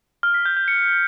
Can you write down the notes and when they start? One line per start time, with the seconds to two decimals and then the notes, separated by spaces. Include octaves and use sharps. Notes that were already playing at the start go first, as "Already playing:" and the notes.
0.23 F6
0.34 B6
0.45 G6
0.57 G6
0.68 C#7